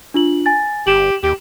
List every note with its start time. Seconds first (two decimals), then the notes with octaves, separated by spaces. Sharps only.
0.14 D4 F4 F#7
0.46 G#5 A6
0.87 G1 G4 E7 F#7
1.23 D#2 G4